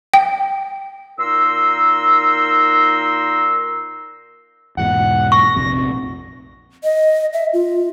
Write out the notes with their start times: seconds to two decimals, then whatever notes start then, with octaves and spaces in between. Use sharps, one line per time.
0.14 G5
1.18 A#2 D#4 A#4 C6 E6
4.77 E2 G#2 B2 F#5
5.32 C#6 A#6
5.56 A#1 F2 C3
6.84 D#5
7.33 E5
7.53 F4